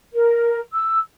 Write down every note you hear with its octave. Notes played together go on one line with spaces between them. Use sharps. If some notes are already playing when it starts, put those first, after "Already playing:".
A#4
E6